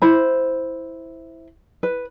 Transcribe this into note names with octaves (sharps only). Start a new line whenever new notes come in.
E4 C5 B5
B4